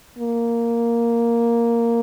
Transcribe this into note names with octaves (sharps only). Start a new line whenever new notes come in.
A#3